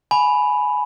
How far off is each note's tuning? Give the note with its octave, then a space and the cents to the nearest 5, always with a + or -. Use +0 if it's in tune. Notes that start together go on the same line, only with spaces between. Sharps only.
G#5 +15 B5 +0